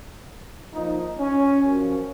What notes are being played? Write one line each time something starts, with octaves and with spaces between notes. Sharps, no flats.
A#2 F3 D#4
C#4
F#2 F3